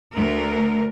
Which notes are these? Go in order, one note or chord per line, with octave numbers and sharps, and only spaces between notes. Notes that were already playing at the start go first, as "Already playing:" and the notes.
D2 A3 A#4